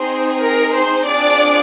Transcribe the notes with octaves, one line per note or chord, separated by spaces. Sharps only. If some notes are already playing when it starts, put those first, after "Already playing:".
Already playing: C4 D#4 G#4 C5
A#4
C5
C4 D4 F4 G#4 D5